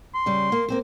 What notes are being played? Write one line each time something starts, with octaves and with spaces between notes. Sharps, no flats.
C6
C#3 G3
A#3
A#3 C4 C5